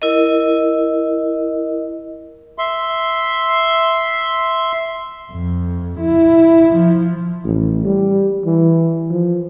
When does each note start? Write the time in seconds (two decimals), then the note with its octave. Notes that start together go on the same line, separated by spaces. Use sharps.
0.02 E4 A#4 D#5
2.58 E5 C6
5.32 F2
6.00 E4
6.75 F3
7.44 A1
7.85 G3
8.45 E3
9.10 F3